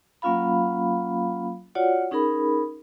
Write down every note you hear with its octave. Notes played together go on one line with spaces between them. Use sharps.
F#3 A#3 C#4 F4 F5 B5
F4 F#4 C#5 D5 F#5
C#4 D#4 G#4 A#4 B5